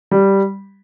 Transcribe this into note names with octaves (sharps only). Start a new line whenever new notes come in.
G3